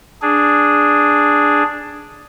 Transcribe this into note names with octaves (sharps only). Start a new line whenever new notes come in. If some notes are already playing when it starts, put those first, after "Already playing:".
D4 G#4